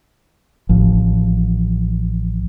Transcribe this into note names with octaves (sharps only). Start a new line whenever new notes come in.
A1 F3